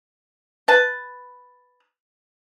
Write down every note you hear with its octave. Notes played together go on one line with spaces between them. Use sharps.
B4 A5